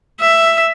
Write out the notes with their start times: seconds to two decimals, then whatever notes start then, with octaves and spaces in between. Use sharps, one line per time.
0.20 E5